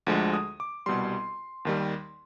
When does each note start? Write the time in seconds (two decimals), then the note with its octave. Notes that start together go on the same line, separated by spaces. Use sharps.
0.07 D2 D3 F3 G#3
0.34 D#6
0.60 D6
0.86 C2 B2 G3 C6
1.65 D#2 D#3 G3